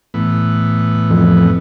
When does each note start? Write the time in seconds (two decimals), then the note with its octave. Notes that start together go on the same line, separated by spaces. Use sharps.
0.14 A2 E3 B3
1.10 F2